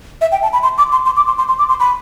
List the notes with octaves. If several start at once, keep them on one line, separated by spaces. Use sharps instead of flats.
E5
G5
A5
B5
C6
D6
C6
C6
D6
C6
C6
C6
D6
C6
B5